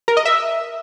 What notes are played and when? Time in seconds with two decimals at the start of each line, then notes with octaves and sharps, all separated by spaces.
0.08 A#4
0.17 D#5
0.25 E5